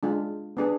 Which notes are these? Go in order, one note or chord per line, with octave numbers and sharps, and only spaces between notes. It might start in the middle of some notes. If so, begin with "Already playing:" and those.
G#3 D4 F4
B3 D4 G#4